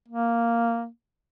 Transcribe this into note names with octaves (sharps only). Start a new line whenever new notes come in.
A#3